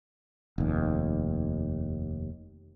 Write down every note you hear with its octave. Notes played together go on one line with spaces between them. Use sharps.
F1 D#2